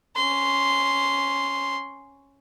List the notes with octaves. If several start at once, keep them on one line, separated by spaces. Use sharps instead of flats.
C#4 C6